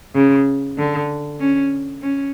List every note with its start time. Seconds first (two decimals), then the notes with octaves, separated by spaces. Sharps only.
0.15 C#3
0.78 D3
1.40 C#4
2.03 C#4